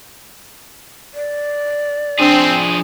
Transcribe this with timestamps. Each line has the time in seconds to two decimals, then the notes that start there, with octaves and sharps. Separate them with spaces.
1.14 D5
2.20 F3 C4 D4 G#4